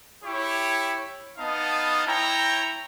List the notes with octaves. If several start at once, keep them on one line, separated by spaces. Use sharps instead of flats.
E4 G4 C#5
B3 D#4 D#5 F5 A5
E4 C#5 G5 A#5